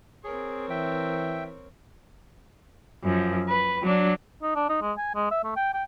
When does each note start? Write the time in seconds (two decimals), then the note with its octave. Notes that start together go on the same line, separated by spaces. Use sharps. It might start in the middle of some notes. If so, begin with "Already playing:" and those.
0.24 C4 G#4 A#4 C#5
0.70 E3 E5 G5
3.04 F#2 F3
3.49 B4
3.83 F#3 D4
4.43 D#4
4.55 D4
4.69 D#4
4.82 G#3
4.98 G#5
5.15 G#3
5.31 E5
5.44 A3
5.56 G5
5.74 G5